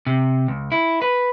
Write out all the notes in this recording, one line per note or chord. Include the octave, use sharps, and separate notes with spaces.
C3
C#2
E4
B4